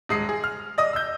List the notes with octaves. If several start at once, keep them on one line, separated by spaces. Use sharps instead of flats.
D#1 G#3 D#6 C7
G#4
F6
D5 D#5 D#6
E6 G6